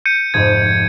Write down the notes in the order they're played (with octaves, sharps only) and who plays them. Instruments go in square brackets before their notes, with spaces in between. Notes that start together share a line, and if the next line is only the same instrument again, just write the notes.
[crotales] G6 C#7 D#7
[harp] F1 G#2 F3 [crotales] G#6